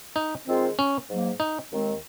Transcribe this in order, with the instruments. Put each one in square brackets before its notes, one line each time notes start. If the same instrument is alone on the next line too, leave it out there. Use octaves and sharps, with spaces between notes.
[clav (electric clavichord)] D#4
[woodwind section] D#3 G#3 C4 F4 C5
[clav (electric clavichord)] C#4
[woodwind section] G#2 F#3 A#3
[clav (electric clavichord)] D#4
[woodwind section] D#2 D#3 G#3 C4